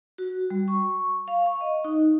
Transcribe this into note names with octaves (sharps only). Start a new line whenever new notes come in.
F#4
G3
C#6
F5
C#6
D#5
D#4